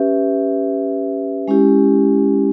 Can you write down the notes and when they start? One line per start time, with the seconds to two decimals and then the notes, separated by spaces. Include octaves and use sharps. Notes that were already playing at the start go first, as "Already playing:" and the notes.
Already playing: C#4 G4 B4 E5
1.48 G#3 C#4 E4 G4